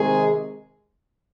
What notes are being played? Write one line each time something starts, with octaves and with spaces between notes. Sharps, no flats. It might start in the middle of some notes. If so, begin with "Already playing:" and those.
Already playing: C3 D#3 G#3 C4 G#4